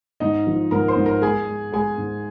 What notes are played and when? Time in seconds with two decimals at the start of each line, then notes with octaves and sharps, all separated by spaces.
0.20 G#2 D#4 D#5
0.47 F3
0.71 G#2 A#4 A#5
0.88 C5 C6
0.96 G#2
1.06 A#4 A#5
1.22 G#3 G#4 G#5
1.47 G#3
1.72 G#3 G#4 G#5
1.98 G#2